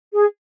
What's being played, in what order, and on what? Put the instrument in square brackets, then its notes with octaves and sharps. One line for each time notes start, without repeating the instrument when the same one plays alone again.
[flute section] G#4